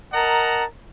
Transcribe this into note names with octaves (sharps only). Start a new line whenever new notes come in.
A#4 D#5 F#5 A5 A#5